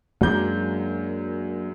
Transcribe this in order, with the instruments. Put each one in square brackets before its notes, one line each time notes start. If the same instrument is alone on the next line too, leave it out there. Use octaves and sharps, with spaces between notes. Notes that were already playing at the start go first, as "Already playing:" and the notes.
[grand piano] F#2 G#3 G6 [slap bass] F#3 A#3 D4